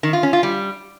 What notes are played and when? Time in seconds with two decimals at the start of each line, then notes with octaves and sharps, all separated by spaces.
0.03 D#3
0.13 F4
0.23 C#4
0.33 F4
0.43 G3